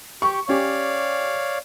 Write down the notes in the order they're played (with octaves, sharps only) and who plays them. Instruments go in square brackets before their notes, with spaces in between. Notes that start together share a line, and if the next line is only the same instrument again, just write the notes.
[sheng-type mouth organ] G4 [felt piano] C#6
[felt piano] C#4 G4 [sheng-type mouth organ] C#5 D5 F5